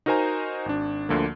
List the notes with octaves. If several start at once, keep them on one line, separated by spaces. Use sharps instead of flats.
D#4 F#4 A#4 C5 G#5 A#5
G#1 D4
D2 D3 F3 A#3